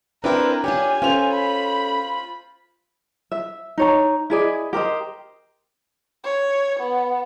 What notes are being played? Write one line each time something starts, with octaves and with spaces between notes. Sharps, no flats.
C4 D4 E4 A#4 B4 G5
D4 F4 G4 C#5 G#5
C#4 F4 A4 C5 F7
B5
E5
D#4 C#5 A#5
E4 G#4 D5 D#5
G4 A#4 C5 D#5
C#5
B3